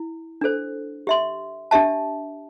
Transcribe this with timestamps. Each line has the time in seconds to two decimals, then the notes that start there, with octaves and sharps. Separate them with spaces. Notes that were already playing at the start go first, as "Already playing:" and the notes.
Already playing: E4
0.41 D4 A4 C5
1.07 G4 E5 C6
1.71 D4 G4 E5 A5